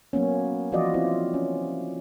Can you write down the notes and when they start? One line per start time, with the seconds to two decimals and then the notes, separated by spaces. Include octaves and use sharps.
0.13 F#3 A#3 B3 C#4
0.72 E3 F3 F4 F#4 D5 D#5
0.94 C4 E4 F4
1.34 C#4